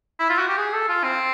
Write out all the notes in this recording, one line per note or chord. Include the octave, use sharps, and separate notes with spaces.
E4
F4
F#4
G4
G#4
A4
F4
C4